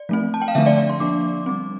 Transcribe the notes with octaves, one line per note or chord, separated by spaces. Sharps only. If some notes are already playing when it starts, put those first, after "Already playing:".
Already playing: D5
F3 A3 C4
A5
G5
F5
D3 F3 A3 D4 E5
D5
D5
C6
F3 A#3 D4 D6
G3 C4